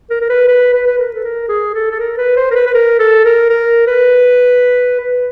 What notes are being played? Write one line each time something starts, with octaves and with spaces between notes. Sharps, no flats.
A#4
A#4
B4
B4
B4
B4
A#4
A4
A#4
G#4
A4
A4
A#4
B4
C5
A#4
B4
B4
A#4
A4
A#4
A#4
B4
B4